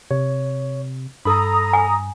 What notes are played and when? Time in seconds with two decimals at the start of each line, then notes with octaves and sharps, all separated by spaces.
0.11 C3 C#5
1.25 G2 A4 A#5 B5 D#6
1.73 G#5